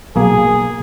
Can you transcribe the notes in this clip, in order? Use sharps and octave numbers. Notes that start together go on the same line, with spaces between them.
B1 A#3 G#4